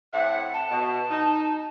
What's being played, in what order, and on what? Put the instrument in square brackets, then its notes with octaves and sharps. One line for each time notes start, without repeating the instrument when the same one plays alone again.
[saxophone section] A2 C4 F#5 [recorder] E5
[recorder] A5
[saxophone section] B2
D#4